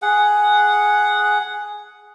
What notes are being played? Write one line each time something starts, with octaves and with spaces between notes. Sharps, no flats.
G#4 F#5